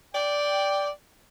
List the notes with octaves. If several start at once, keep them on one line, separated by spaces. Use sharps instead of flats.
D5 G5